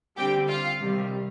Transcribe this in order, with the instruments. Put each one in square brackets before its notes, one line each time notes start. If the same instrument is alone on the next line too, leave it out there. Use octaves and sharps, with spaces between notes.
[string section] D3 G3 C4 G4 G5
F4 F5
C3 D#3 G3